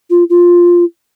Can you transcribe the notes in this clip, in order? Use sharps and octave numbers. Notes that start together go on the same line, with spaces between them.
F4
F4